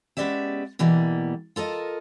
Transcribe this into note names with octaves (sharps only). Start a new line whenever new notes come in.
G#3 B3 C#4 G4 D5 E5
B2 E3 G3 A#3
F4 A4 A#4 D#5